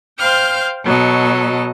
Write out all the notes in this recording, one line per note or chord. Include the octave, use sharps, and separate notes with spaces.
C5 F5 G5 F6 G6
B2 F#3 A4 D#5